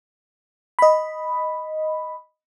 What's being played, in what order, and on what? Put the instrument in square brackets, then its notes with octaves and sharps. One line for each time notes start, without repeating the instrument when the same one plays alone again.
[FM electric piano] D#5 B5